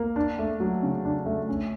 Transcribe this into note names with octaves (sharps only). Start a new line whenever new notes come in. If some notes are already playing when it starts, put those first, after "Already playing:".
Already playing: A#3
D4
A3
F#3
C#3
D4
A3
C#4